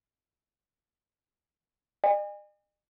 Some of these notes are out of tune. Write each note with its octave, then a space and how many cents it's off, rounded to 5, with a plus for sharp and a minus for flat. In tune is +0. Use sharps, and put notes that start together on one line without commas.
D#5 -45 G#5 -35